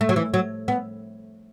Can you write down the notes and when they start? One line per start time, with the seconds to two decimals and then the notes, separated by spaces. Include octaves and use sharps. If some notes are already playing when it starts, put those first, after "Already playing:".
0.01 A3
0.09 F#3
0.16 E3
0.34 F#3
0.68 B3